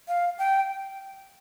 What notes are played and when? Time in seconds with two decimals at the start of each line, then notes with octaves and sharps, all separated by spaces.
0.08 F5
0.39 G5